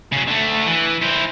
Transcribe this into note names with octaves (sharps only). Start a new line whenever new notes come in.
C#3 F#3
D3 A3
E3
E4 C5